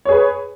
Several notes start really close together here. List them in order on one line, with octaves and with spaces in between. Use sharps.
C#5 G#4 B4